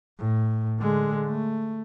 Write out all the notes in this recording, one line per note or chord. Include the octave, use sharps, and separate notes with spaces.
A2
D3 G#3
A3